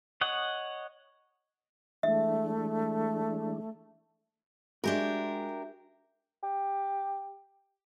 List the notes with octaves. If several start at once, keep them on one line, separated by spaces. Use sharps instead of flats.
C#5 D#5 F#5
E3 G#3 A3 D4 E5
G#3 D4 F#4 G4 A#4 E5
G4